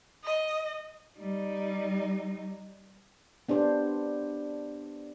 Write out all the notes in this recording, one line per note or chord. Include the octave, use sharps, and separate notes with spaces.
D#5
G3 D#4
B3 D4 G4 C5